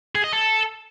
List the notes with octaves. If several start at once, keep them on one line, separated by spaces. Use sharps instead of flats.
G#4
D#5
A4